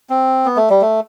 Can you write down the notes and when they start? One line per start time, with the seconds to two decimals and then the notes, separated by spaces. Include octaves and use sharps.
0.09 C4
0.45 B3
0.57 A3
0.70 G3
0.81 A3